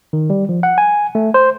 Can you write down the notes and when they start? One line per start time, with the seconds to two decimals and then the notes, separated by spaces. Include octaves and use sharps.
0.13 D#3
0.30 G3
0.49 F3
0.63 F#5
0.78 G#5
1.15 A3
1.34 C5